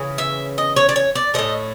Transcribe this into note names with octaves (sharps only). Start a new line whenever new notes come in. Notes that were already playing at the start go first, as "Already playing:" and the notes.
Already playing: C#3 E3
E5
D#5
C#5
D5
C#5
D5
A2 F3 A3 D#5